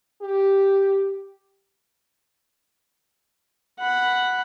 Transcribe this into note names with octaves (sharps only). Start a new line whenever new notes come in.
G4
F#5 B5